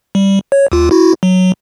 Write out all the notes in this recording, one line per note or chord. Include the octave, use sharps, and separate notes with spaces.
G3
C#5
D#2 F4
E4 F#4
F#3